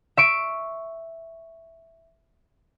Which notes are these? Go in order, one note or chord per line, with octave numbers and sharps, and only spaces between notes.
E5 C#6 D7